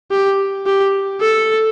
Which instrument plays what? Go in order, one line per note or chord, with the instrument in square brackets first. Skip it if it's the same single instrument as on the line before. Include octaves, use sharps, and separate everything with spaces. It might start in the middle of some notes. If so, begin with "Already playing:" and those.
[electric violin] G4
G4
A4